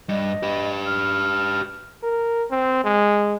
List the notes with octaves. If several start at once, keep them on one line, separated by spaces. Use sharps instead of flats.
G2 D#5
G4 B4
F6
A#4
C4
G#3